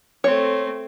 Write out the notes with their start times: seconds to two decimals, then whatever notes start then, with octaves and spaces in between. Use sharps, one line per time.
0.24 A3 C4 C#5